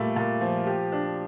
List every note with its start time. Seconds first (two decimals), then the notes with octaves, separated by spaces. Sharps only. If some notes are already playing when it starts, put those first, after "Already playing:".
Already playing: A#2 G3 A3
0.16 A#2
0.41 F3
0.66 G4
0.92 D4